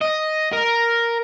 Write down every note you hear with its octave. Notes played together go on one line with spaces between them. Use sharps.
D#5
A#4